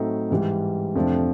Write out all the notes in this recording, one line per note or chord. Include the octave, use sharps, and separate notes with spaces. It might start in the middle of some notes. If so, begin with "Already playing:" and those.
Already playing: A2 F#3 A3 C4 D#4
G#2 E3 G3
F2 C3 F3 A3 D4